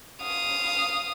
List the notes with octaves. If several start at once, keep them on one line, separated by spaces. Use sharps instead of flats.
F5 D#6